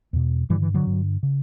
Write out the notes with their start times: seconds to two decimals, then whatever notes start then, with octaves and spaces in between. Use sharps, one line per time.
0.13 E2 B2
0.50 G2 D3 E3 G3
0.62 E3
0.74 D3 F#3
0.87 G2 D3
1.23 C#3